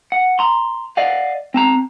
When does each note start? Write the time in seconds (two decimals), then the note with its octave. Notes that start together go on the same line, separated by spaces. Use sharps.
0.12 F#5
0.39 A#5 C6
0.97 D5 D#5 F5 F#5
1.54 C4 A5 A#5